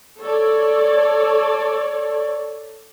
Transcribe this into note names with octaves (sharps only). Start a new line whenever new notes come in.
A4 C#5 D5